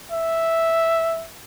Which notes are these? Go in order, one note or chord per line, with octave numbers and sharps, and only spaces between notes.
E5